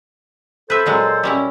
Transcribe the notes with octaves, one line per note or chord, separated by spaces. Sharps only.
A4 B4 C5 E5
A#2 F#3 G#3
G3 C#4 E4